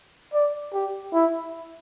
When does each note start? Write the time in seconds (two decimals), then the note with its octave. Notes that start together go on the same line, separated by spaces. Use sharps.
0.33 D5
0.73 G4
1.14 E4